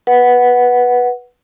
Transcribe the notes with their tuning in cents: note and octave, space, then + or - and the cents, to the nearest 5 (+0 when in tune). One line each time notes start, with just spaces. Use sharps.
B4 -10 F#5 +0